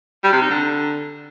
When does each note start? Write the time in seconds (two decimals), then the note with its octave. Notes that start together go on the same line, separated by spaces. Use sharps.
0.24 G3
0.33 C3
0.41 D#4
0.50 D3